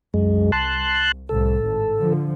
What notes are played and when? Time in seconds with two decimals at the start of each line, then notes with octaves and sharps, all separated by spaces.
0.14 C2 F#2 G#3
0.52 A5 C6 F#6
1.29 C2 A2 A4
1.65 G#1
1.99 D3 F3